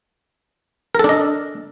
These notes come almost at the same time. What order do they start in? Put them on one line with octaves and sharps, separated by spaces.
A#4 A4 D4 D#5